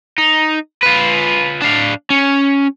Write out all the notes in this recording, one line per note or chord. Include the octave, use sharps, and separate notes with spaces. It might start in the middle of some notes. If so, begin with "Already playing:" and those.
D#4
F4 B4
D4 F5
C#4